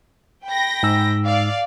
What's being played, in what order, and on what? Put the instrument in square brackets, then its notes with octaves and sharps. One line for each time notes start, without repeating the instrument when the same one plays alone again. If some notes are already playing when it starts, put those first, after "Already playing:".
[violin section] G5 B5 A#6
[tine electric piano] G#2 E6
[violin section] D5 F5